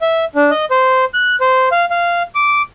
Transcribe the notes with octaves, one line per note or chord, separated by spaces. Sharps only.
E5
D4
D#5
C5
F#6
C5
F5
F5
D6